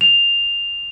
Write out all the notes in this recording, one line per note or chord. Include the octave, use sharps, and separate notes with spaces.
F7